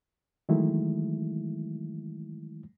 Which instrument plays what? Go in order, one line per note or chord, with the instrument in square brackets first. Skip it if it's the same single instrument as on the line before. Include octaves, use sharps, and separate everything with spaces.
[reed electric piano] D#3 E3 F#3 G#3 A3 E4